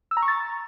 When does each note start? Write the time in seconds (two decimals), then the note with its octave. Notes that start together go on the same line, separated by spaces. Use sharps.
0.11 E6
0.17 A#5
0.22 C#6
0.28 A6